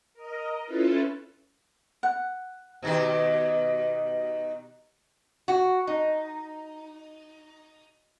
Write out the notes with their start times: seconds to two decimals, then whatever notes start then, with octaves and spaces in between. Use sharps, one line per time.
0.14 A#4 D#5
0.65 C#4 E4 F4 A4 B4
2.03 F#5
2.82 B2 D#3 G4
5.48 F#4
5.87 D#4